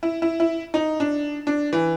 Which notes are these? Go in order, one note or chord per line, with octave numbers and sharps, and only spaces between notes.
E4
E4
E4
D#4
D4
D4
E3